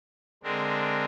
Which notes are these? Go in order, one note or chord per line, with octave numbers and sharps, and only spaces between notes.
D3 G#3 C4 D4 A#4